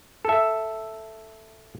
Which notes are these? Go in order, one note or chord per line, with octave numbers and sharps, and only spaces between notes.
A4 E5